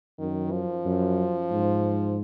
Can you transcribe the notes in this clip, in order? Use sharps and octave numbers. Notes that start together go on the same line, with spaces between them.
F#2 D#3
F3
F#2
G#2